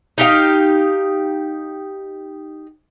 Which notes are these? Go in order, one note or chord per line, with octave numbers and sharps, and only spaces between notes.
D#4 G4 F5